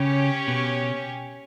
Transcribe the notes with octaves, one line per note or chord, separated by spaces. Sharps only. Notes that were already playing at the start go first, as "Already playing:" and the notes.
Already playing: C#3 C#4 G4 C#5
B2